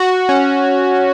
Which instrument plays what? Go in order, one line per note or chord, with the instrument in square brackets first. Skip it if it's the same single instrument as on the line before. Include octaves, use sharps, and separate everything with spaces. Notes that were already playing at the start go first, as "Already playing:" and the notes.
Already playing: [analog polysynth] F#4
C#4